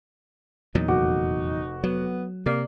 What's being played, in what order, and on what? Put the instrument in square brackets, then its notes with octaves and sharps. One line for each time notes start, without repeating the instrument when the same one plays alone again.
[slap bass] E2 A#2 F#3 [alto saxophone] D#4
[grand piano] F1 F#4 D6
[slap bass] F#3 [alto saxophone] B3
[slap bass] C3 [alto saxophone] A#3 [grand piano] D5